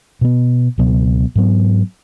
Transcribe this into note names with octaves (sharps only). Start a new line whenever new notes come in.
B2 B3
C#2 B2 F#3 B3
G#2 F#3 B3